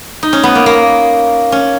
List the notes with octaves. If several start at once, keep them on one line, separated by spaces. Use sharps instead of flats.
D#4
C#4
B3
A#3
A#3
C#4